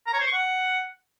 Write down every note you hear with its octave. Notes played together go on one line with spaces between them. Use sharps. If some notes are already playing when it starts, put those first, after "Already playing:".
A#5
C#5
C5
C#6
F#5